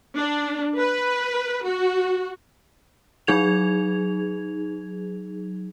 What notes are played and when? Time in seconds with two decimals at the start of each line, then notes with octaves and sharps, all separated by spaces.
0.18 D4
0.76 B4
1.65 F#4
3.27 F#3 D#4 G#4 G#6 F7